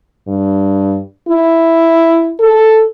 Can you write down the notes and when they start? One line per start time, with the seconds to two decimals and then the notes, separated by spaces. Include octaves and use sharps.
0.28 G2
1.29 E4
2.40 A4